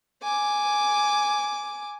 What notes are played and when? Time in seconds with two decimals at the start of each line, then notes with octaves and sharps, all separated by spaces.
0.23 G#5 D6